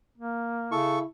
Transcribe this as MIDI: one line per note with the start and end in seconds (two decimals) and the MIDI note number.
0.18 0.75 58
0.72 1.00 49
0.72 1.06 64
0.72 0.99 69
0.72 0.99 85